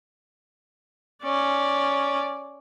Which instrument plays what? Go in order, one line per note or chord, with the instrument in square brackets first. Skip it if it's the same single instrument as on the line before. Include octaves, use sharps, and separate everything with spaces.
[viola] C#4 D5